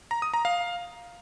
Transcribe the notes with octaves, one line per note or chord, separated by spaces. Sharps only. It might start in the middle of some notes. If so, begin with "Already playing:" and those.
A#5
D#6
A#5
F5